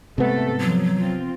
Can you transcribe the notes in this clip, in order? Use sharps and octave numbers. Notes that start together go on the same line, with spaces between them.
G#2 C3 A3 B3 A4
F3 F#3
F3 C4 F4